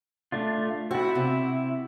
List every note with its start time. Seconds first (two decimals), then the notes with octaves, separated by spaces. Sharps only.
0.32 A3 D4 F4
0.91 C4 E4 F#4
1.15 C3